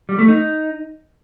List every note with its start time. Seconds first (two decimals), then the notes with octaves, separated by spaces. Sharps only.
0.09 G3
0.19 A3
0.28 D#4